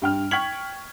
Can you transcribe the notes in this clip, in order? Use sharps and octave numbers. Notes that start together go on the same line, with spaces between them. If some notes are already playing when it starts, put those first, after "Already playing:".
G2 G5 F6
G5 C#6 F6 G#6 B6 F#7